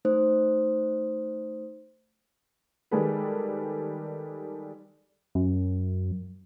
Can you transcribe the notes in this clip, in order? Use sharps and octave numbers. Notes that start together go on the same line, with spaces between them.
A3 D#4 C5 D#6
D#3 G3 G#3 A4 B4
F#2